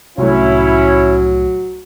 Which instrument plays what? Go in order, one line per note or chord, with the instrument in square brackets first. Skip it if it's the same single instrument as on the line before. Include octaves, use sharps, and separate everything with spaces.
[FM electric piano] C2 A2 [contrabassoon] F#3 [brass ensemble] C#4 E4 C#5